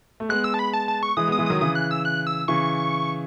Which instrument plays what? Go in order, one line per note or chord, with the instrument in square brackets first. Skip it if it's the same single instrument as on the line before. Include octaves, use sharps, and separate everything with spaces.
[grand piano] A3
[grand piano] G#3 B3 [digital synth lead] F#6
[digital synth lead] E6
A5
B5
A5
A5
C#6
[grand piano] E3 G#3 [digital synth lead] D#6
[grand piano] G#3 B3
[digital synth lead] D#6
[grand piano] E3 G#3
[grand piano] D#3 F#3 [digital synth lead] D#6
[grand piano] C#3 E3 [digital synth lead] D#6
[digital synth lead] F#6
E6
F#6
E6
[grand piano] C#3 E3 [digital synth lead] C#6